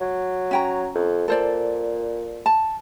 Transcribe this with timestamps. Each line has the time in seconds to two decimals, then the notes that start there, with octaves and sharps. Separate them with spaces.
0.01 F#3
0.51 C#4 G5 A#5
0.95 F2
1.28 A#2 A4 C5 D5
2.46 A5